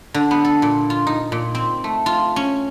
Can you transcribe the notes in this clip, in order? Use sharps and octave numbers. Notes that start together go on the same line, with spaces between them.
D3
B3
A4
A#2
F4
D#4
A#2
C4
A3
F4
C#4